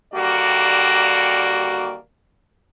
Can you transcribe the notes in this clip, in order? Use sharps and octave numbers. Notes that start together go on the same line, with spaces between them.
D#2 D3 G3 A#3 F#4 D5